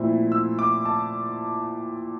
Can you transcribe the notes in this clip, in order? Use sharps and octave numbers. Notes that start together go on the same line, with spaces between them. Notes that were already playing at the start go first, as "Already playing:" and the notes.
Already playing: A#2 F3 A3 C4 E4
E6
D6
A5